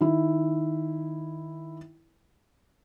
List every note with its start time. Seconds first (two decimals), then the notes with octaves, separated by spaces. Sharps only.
0.01 D#3 E4